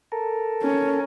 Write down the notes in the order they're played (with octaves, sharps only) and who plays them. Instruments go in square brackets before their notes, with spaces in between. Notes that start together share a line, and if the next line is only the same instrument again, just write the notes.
[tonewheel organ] A4 A#4
[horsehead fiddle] C#4